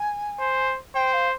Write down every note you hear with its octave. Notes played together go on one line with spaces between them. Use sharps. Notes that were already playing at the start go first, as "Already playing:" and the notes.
Already playing: G#5
C5
C5 G5
F5